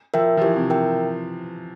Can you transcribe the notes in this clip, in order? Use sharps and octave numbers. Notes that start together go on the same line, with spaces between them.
F3 A#4 E5 G5
F3
E3 G4
C3
A#4 E5 G5